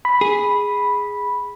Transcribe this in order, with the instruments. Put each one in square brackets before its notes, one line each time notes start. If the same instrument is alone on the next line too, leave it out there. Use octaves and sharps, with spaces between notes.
[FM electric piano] B5
[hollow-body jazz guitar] G#4